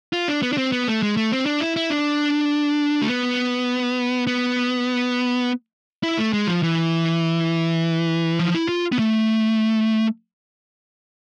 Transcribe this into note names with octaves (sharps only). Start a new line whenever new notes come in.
F4
D4
B3
D4
C4
B3
A3
G#3
A3
C4
D4
E4
E4
D4
A3
B3
B3
E4
A3
G#3
F3
E3
F3
E4
F4
B3
A3